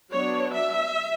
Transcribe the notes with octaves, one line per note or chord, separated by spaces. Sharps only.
F#3 B3 D4 C#5
E5